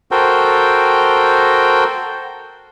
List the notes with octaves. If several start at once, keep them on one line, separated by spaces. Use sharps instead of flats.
F#4 A4 A#4 C5 G5